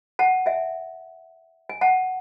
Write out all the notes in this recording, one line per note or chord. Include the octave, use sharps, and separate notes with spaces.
F#5 A5
E5 G#5
G#5
F#5 A5